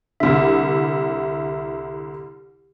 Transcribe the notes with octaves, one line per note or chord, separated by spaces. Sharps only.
C2 D3 E5